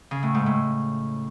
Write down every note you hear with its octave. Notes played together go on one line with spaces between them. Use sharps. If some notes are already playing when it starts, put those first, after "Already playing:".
C#3
A2
G#2
A2